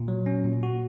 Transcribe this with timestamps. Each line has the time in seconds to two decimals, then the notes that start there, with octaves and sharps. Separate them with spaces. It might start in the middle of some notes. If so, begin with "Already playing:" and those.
Already playing: A#2
0.08 F#3
0.26 C#4
0.45 A#2
0.63 F#4